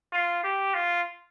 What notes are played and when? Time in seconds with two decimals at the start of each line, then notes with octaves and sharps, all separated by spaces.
0.12 F4
0.44 G4
0.74 F4